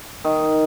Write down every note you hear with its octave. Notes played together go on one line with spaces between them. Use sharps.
D#3